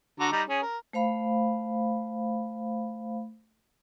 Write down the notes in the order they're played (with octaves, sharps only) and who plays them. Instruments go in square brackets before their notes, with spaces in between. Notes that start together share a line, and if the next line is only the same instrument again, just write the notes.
[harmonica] D3 F#4 A#5
G3 D#4 A#5
C#4 G#4
A#4
[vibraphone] A3 C5 F5 B5